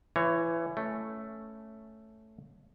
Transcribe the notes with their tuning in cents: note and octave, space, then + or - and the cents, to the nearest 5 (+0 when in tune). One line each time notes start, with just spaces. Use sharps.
E3 +20 C#5 +0
A3 +0 C#4 +0